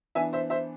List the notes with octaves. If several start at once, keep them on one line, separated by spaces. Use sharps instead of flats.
E3 B3 D4 E5 G#5
C5 E5
C5 E5